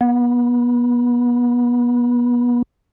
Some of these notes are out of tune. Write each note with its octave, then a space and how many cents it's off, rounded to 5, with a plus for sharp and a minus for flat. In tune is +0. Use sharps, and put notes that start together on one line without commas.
B3 -30